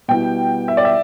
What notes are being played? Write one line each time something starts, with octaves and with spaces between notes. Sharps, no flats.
B2 G3 B3 E4 G5
E5
D5
E5